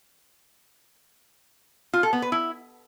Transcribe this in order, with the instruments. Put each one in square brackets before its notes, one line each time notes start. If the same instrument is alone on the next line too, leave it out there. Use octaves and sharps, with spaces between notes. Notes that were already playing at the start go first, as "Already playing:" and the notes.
[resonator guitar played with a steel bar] F4
A4
B3
B4
E4